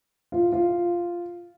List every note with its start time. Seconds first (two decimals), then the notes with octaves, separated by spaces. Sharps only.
0.32 F4
0.52 F4